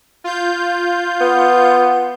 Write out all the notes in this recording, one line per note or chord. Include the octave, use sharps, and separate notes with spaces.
F4 G6
B3